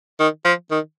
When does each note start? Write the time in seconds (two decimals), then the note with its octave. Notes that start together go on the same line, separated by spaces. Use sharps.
0.20 D#3
0.45 F3
0.71 D#3